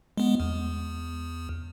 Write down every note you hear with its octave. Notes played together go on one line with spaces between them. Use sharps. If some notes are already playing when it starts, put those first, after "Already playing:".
G#3 B3
E2